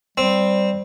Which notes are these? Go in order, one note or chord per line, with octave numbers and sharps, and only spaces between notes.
G3 C4